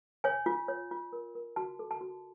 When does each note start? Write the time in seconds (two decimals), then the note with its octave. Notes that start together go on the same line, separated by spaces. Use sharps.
0.24 C#5 G#5
0.46 F4
0.68 C#5
0.91 F4
1.13 A#4
1.35 A#4
1.56 F#4 A5
1.79 A4
1.91 A5
2.01 F#4